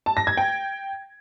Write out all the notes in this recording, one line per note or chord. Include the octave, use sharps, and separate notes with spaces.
A5
A#6
G#6
G5